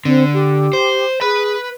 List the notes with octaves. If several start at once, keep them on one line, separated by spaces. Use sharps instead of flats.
D3 C4
G4
C5
G#4 B4 B5